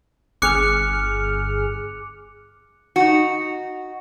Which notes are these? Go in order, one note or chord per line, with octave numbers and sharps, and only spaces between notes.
G1 G#4 D6 F6 F#6 C#7
D#4 F#4